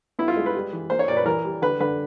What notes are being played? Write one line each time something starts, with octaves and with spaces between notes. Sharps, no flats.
B3 E4
F4
G#3
B4
G3
E3
A#3 C5
C#5
A#2 D5
B4
E3 A#4
G3
D3 B4
D3 B4